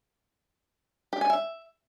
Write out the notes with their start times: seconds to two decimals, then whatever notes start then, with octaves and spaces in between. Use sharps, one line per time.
1.13 G4
1.21 G#5
1.30 E5